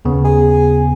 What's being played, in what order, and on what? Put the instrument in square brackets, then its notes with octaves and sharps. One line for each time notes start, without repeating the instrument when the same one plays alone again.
[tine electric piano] D#2 C#3 B3
[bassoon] G#4